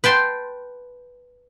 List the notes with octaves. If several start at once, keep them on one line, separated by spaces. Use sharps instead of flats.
B4 G5 A5 C6